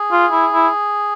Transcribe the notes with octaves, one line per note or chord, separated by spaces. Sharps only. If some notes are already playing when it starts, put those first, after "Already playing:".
Already playing: G#4
F4
E4
E4